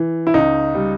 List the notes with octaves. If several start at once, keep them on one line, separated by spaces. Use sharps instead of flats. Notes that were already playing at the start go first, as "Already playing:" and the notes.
Already playing: E3
E4
C#2 D#4
G3